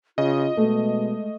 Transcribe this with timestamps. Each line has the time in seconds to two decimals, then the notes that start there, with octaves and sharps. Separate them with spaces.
0.18 C#3 F4 D#5
0.57 B2 G#3 A3